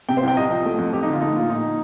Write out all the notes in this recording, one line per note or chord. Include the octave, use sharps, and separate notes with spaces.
C3 G5
C5
C2 G5
C2 D#5
F3
A3
F2
F2 G4
D#4
D3
F4
A3 D#4
A#2 F4
A#2 D#4